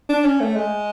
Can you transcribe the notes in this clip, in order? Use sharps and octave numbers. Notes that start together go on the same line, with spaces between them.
D4
C#4
A3
G#3